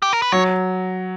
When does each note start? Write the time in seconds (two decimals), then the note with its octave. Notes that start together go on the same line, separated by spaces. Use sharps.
0.02 G4
0.13 A#4
0.22 B4
0.32 F#3 C#5